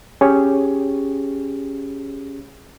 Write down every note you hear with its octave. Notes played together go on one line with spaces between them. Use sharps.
C#4 G4 G#4 C#5